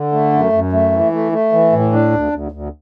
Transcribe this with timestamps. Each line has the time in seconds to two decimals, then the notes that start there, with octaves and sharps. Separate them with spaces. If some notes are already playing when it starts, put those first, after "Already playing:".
Already playing: D3
0.12 A3
0.33 F#2
0.52 F#2
0.72 A3
0.92 E3
1.12 A3
1.32 A3
1.52 E3
1.72 A2
1.92 D4
2.12 D2
2.32 D2
2.52 D2